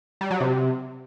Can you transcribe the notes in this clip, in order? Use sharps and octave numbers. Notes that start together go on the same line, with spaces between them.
G3
F#3
C3